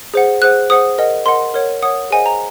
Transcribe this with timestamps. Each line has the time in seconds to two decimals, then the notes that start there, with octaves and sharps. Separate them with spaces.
0.14 G#4 C5 F#5
0.42 G#4 C5 F#5 F#6
0.70 G#4 C5 F#5 D#6
0.98 A#4 D#5 F#5
1.26 A#4 D#5 F#5 C6
1.54 A#4 C#5 F#5
1.82 A#4 C#5 F#5 D#6
2.11 G#4 C5 D#5 F#5 G#5
2.26 A#5